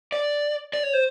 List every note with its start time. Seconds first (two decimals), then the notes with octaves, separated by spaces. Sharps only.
0.12 D5
0.73 D5
0.83 C#5
0.93 C5